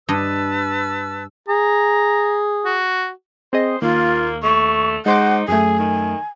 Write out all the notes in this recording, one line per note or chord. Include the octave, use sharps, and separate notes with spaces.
G2 B4 D#5 A5 E6
G#4 A#5
F#4
C4 G#4 C5 D#5
D#2 A#3 F4
A3 C#6
G#3 D#4 C5 F#5 D6
F#2 A3 G#4 G#5
D#3